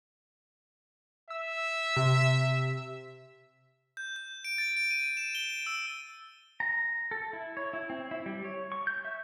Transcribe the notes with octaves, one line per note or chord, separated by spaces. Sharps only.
E5 E6
C3
G6
G6
D7
A6
D7
D#7
E7
G7
E6
A#5
A4
E4
C#5
E4
C4
E4
G3
C#5
C#6
G6
E5